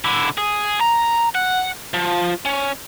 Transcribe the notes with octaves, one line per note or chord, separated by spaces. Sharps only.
D3 E4
G#4
A#5
F#5
F3
C#4